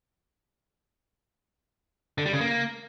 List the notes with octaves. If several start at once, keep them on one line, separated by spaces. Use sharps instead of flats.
D3
G3
C#3
A#3